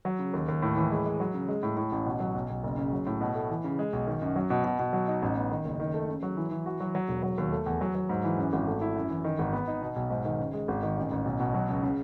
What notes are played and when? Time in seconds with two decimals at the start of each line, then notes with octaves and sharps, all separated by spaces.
0.05 F#3
0.19 C#3
0.33 D#2
0.48 D#2
0.62 A2
0.77 E3
0.91 G#3
1.06 G#3
1.20 F#3
1.34 C#3
1.48 G#3
1.63 A2
1.77 A2
1.92 A1
2.06 B2
2.20 F#3
2.34 B1
2.49 B1
2.64 F#1
2.78 C#3
2.92 F#3
3.07 A2
3.21 B2
3.35 A3
3.50 E3
3.64 C#3
3.79 G#3
3.93 B1
4.07 D#3
4.22 F#2
4.36 F#3
4.50 B2
4.64 B2
4.79 B2
4.93 F#3
5.08 D#4
5.22 A1
5.37 B3
5.51 D#3
5.65 F#1
5.80 D#3
5.94 A3
6.08 C#3
6.23 F#3
6.37 E3
6.51 E3
6.66 F#4
6.80 F#3
6.95 F#3
7.08 E1
7.23 F#3
7.38 D#2
7.52 A3
7.66 E2
7.81 F#3
7.95 F#3
8.09 G#2
8.24 E3
8.38 F#2
8.53 G#1
8.67 A3
8.81 E4
8.96 F#2
9.10 E3
9.24 D#3
9.39 G#1
9.53 B3
9.68 D#4
9.82 B2
9.96 B1
10.10 G#2
10.25 D#3
10.40 C#3
10.54 G#3
10.68 G#1
10.83 D#3
10.97 A1
11.11 A1
11.25 B1
11.40 B2
11.54 F#3
11.69 C#2
11.83 C#3